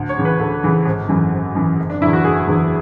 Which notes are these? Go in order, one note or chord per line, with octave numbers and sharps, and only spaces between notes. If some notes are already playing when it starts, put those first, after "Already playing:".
Already playing: D2
C#5
C#3 E3
B4
D2 A4
C#3 E3
G#1
F#2 E3
G#1
F#2 E3
F#1
D4
E2 D3 E4
F#4
F#1 G#4
E2 D3